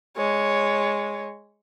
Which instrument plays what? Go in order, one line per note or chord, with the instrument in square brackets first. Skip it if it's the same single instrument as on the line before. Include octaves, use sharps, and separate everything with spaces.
[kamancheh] G#3 C#5